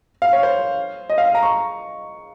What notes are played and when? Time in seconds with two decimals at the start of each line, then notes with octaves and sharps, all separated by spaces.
0.22 F5
0.33 C#5
0.43 C5
1.10 D#5
1.18 F5
1.35 A#5
1.43 C#6